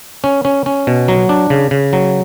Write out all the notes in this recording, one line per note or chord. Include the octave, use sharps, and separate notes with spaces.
C#4
C#4
C#4
B2
F#3
D4
C#3
C#3
F#3